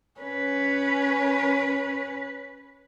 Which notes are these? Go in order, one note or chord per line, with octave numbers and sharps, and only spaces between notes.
C#4 B4